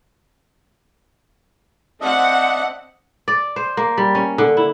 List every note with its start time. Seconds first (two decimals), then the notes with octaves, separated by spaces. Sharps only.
2.01 C4 D4 D#5 E5 F#5
3.28 D5
3.56 C5
3.77 A#3
3.98 G3
4.15 C#4
4.38 D3
4.57 E4